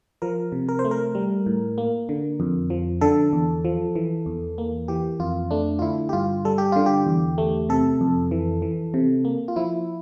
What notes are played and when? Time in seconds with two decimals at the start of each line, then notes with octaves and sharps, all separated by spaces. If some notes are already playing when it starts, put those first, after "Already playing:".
0.22 F3 A#4
0.52 C3
0.69 A#4
0.79 C5
0.85 A3
0.91 A#4
1.15 G3
1.46 A2
1.78 A#3
2.09 D3
2.40 F2
2.70 F3
3.01 D3 A4
3.33 E2
3.65 F3
3.96 E3
4.26 E2
4.58 A#3
4.88 E3 G4
5.20 F2 F4
5.51 A3 D4
5.79 F4
5.82 D3 E4
6.09 G4
6.13 G2 F4
6.45 G3 A4
6.58 G4
6.72 D3 F4
6.86 G4
7.07 E2
7.38 A3
7.69 C3 A4
8.01 F2
8.31 E3
8.62 E3
8.94 C3
9.25 A#3
9.48 F4
9.56 F3 E4